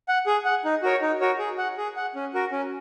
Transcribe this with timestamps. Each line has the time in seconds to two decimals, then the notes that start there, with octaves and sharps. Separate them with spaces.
0.08 F#5
0.27 G#4
0.45 F#5
0.65 D#4
0.82 F#4 A#4 C#5
1.02 D#4
1.20 F#4 A#4 C#5
1.39 G#4
1.58 F#5
1.77 G#4
1.96 F#5
2.15 C#4
2.34 F#4 A#4
2.52 C#4